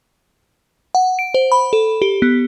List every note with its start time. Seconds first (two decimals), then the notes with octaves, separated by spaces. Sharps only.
0.95 F#5
1.19 D7
1.34 C5
1.52 B5
1.73 A4
2.02 G4
2.22 B3